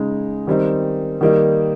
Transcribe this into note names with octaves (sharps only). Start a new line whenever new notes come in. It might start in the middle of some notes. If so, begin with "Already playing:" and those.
Already playing: C#3 G#3 D#4
D#3 G3 C4 D#4
D#3 G3 A#3 D#4